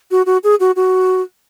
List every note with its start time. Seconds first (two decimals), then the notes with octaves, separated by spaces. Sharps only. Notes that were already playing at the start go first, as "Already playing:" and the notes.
0.11 F#4
0.26 F#4
0.44 G#4
0.60 F#4
0.76 F#4